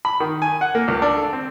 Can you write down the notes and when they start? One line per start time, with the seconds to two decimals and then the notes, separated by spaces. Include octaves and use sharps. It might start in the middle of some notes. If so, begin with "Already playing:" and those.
0.05 B5
0.20 D#3
0.42 G#5
0.61 F#5
0.75 A#3
0.88 C#2
1.02 D4
1.17 A4
1.33 C4